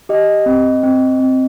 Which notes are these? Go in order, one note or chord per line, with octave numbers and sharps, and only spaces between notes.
G4 D#5
C4
C4
C4